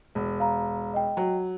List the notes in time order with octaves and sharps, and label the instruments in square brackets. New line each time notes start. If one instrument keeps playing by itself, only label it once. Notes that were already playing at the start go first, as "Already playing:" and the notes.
[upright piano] E1
[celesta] F5 A#5
D#5 G5
[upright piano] F#3